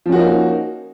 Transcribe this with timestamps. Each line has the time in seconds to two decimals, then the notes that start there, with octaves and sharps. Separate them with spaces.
0.06 F3
0.09 C#4
0.12 F#4
0.16 A#3
0.19 D#4